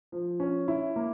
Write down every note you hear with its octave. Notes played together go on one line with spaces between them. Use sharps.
F3
C#4
E4
A#3